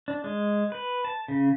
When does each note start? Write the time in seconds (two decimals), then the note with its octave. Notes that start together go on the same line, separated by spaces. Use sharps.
0.08 D4
0.24 G#3
0.72 B4
1.05 A5
1.28 C#3